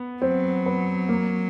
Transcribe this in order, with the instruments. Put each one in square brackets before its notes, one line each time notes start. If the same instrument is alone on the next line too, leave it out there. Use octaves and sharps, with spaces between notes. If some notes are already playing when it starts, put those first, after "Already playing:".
Already playing: [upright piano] B3
[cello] F#3 [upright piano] C4
[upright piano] B3
A#3